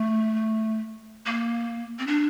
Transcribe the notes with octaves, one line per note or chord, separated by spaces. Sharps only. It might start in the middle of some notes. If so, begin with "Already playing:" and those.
Already playing: A3
A#3
C4
D4